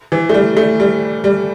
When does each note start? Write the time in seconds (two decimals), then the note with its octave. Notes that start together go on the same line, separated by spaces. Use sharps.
0.12 E3
0.29 A3
0.34 G3
0.57 A3
0.80 G3
1.24 G3